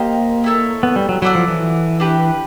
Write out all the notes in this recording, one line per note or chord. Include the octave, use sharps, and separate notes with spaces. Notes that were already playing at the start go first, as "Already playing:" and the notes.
Already playing: A#3 G4 C5 D#5
E4 A4 C#5
B3
G3
F#3
F#3 E4 A4 D5 F#5
F3
E3
D4 G4 B4